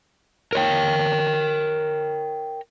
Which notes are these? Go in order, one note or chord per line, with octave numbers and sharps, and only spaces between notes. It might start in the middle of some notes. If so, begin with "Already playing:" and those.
A#4 C#5 G5